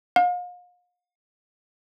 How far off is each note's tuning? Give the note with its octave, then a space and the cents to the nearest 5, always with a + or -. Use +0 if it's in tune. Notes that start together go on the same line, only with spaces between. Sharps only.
F5 +40